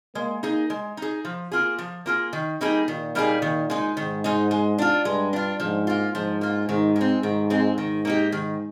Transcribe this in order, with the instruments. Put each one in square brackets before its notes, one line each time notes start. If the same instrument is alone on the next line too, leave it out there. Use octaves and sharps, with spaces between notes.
[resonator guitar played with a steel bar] G#3 [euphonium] A#3
[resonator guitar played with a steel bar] D#4 G#4
G#3
D#4 G#4
F3
A#3 F4 G#4
F3
A#3 F4 G#4
D#3
G3 A#3 D#4 G#4
[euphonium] A#2 [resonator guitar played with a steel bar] D#3
[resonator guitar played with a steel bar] G3 A#3 D#4 G#4
D#3
G#3 D#4
[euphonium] G#2 [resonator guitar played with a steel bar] D#3
[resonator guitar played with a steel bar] G#3 D#4
G#3
D4 F4
[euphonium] G2 [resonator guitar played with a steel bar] G#3
[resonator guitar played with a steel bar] D4 F4
[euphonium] G#2 [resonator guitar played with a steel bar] F3
[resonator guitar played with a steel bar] A#3 F4
[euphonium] G#2 [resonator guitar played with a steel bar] F3
[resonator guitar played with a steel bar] A#3 F4
[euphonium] G#2 [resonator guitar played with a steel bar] D#3
[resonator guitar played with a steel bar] G#3 C4
[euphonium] G#2 [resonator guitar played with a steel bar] D#3
[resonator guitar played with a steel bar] G#3 C4
[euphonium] G#2 [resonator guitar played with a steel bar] D#3
[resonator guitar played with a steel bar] A#3 D#4 G4
D#3